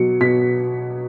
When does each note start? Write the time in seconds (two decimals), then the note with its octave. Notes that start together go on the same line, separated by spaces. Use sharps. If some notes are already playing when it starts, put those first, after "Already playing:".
Already playing: B2 F#3 C#7
0.21 B2 B6